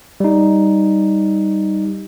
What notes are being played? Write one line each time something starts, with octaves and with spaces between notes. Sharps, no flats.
G3 D#4